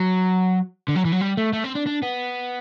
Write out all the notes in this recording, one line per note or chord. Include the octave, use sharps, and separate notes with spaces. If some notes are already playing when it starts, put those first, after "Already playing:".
Already playing: F#3
D3
F#3
E3
F#3
G3
A3
A3
C4
D4
D4
B3